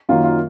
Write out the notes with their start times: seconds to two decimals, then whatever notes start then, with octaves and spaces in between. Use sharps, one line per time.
0.09 F#2 D#3 F#3 A#3 F4
0.24 F4